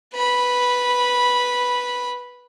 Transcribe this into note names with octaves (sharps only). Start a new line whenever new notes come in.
B4 B5